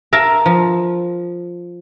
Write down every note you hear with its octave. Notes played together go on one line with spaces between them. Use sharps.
A#4 E5 F5 A5 A#5
F3